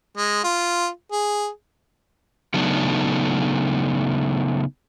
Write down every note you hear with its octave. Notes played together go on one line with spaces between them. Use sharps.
G#3
F4
G#4
C#3 F#3 A3 B3 D4 D#4